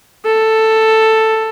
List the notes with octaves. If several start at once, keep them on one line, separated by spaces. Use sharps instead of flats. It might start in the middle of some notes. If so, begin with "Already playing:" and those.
A4